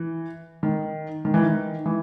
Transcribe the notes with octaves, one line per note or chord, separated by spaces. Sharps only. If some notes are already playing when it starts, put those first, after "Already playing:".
Already playing: E3
D#3
D#3
E3
D#3
E3